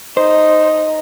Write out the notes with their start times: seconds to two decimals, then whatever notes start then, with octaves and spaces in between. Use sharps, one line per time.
0.17 D#4 C5